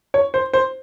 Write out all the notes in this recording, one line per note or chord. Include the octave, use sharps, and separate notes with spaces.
C#5
C5
C5